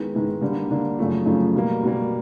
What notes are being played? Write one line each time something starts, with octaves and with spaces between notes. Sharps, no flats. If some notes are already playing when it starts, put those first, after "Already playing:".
Already playing: D#3 G#3 B3 E4
G#2 D#3 G#3 B3 E4
D3 G3 A#3 D4
D3 G3 A#3 D4
F#2 C#3 F3 A3
F#2 C#3 F3 A3
B2 G3 A#3
B2 G3 A#3